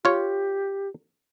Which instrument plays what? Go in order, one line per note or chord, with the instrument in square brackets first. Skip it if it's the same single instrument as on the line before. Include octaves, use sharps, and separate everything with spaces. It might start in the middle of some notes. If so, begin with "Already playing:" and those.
[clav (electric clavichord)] F4 C#5 [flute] G4